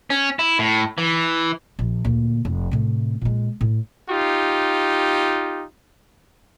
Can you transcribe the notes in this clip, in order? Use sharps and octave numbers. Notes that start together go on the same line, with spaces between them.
C#4
E4
A2
E3
A#1
D2 A#2
F1
A2 C3
A#2 G#3
A2
D#4 F4 G4